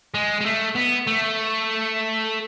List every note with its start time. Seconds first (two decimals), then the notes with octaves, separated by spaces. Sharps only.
0.14 G#3
0.41 G#3
0.46 A3
0.76 B3
1.08 A3